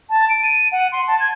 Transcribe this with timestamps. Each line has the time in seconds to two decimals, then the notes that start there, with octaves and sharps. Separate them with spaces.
0.10 A5
0.29 D7
0.43 D#7
0.72 F#5
0.92 C6
1.08 A5
1.20 G#6